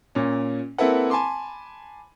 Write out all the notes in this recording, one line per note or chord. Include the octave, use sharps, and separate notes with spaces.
A#2 C#4
A#3 C4 E4 A4 B4 F#5
G#5 A5 B5 C6 D6